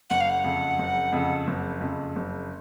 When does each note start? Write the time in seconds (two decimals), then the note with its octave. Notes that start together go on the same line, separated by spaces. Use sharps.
0.10 F#1 F#5
0.21 F5
0.30 F#5
0.44 F2 C#3
0.79 F#1
1.13 F2 C#3
1.47 F#1
1.81 F2 C#3
2.16 F#1